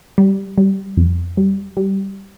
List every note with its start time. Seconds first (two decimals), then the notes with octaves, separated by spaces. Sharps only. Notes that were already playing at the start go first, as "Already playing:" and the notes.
0.18 G3
0.58 G3
0.97 F2
1.37 G3
1.77 G3